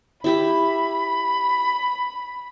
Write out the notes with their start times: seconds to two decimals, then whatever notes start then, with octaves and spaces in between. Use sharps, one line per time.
0.24 E4 G4 E5 B5